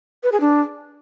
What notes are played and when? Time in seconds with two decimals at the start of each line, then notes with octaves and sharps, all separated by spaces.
0.23 B4
0.32 G#4
0.40 D4